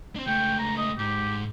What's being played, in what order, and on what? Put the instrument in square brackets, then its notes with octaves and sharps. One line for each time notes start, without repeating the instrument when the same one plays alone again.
[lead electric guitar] C4 D4
[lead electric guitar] C#2 A3 [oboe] G5
[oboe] A#5
D#5
[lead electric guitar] G#2 [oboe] G4